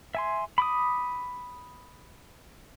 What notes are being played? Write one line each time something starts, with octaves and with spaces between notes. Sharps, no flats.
E5 G#5 C6
B5 D6 D#6